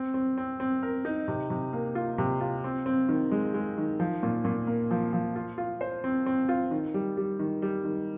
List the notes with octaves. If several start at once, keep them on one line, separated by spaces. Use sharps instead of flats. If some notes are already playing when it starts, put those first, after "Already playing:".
Already playing: C4
C4
C4
C4
A#4
D#4
C3
C3
A#3
F4
C3
F4
C4
C4
D#3
G#3
G#3
D#3
F3
A#2
A#2
A#3
F3
F3
F4
F4
C5
C4
C4
F4
D#3
G3
G3
D#3
G3
D#3